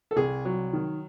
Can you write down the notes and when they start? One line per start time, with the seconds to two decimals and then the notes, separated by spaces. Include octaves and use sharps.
0.11 A4
0.16 C2 G#4
0.45 F#3
0.73 D#3